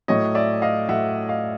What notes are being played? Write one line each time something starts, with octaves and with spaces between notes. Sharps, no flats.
A2 F#3 A3 C#5 D#5
D5 E5
D#5 F5
A2 F#3 A3 E5 F#5
D#5 F5